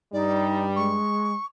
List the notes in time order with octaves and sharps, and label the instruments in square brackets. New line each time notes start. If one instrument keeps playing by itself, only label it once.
[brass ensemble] G2 G3 [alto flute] D#4 [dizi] D5
[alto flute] G#3 [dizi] C#6